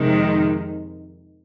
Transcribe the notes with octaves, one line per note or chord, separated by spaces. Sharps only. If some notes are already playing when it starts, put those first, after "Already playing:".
Already playing: F2 C3 D#3 G#3